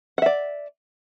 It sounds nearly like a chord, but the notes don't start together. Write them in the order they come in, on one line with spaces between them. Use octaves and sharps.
F#5 E5 D5